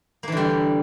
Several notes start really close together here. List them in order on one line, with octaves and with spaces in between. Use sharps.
A#3 E3 D3 G3